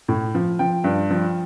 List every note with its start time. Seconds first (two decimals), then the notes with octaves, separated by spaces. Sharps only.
0.08 A2
0.35 F3
0.59 F3 G5
0.84 G2
1.10 F3